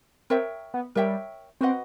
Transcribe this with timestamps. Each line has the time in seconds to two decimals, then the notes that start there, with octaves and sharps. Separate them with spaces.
0.30 C4 A#4 C#5 E5 G5
0.74 B3
0.95 G3 A#4 C#5 E5 G5
1.61 C4 F#4 B4 D#5 F#5